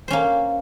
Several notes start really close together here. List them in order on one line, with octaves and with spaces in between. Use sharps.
C5 C#4 A#3